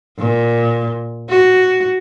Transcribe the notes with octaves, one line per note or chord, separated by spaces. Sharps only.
A#2
F#4